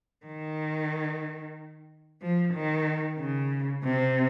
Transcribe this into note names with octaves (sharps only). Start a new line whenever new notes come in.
D#3
F3
D#3
C#3
C3